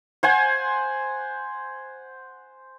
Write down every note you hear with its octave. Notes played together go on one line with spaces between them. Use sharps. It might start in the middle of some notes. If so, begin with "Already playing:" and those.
C5 F#5 G#5